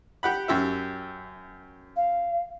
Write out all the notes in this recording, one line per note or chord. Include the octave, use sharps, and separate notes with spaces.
G4 F#5 B5
F#2 G4 E5
F5